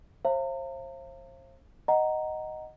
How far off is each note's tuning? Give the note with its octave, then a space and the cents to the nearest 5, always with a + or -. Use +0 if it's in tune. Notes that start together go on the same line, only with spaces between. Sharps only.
C5 +40 F5 -40 A#5 -40
D#5 +0 F#5 +10 A#5 +0